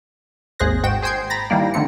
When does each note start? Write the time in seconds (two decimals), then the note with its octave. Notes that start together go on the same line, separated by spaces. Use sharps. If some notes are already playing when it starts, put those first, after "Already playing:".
0.59 G#1 D#2 G#4 C5 F#6 A#6
0.83 G#2 F#4 G5 E7
1.02 G#4 C5 G5 C6 G6 G#6
1.30 A#5 B5 A6 A#6
1.50 D#3 E3 G3 A#3 D5
1.74 D3 D#3 A3 C4 C#7